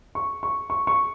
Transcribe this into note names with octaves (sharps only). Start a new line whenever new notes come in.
C#6
C#6
C#6
C#6